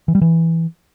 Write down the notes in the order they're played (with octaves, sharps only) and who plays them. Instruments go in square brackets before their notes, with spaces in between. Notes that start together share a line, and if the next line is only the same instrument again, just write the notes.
[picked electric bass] E3
G3
E3